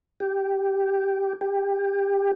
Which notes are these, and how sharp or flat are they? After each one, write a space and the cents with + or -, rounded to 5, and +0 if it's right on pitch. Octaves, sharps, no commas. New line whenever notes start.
G4 -5
G4 +20